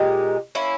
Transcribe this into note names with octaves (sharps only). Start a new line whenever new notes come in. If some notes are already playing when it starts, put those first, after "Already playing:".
Already playing: A#2 G#3 D#4 G4
A#3 C#4 E4